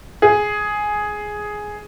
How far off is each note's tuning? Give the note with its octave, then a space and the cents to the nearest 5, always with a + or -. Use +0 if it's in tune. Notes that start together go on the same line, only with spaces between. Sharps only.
G#4 +5